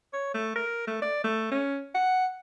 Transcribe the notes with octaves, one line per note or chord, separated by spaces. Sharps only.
C#5
A3
A#4
A3
D5
A3
C#4
F#5